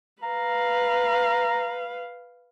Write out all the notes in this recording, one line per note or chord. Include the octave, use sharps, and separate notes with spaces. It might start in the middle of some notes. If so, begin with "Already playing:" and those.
B4 F5 A#5